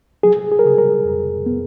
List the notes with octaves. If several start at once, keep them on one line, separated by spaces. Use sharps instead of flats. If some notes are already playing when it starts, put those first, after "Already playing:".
F#3 G#4
G#4
A#4
C#3 G#4
A#4
F2
B3